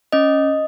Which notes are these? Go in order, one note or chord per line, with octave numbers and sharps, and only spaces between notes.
C#4 D#5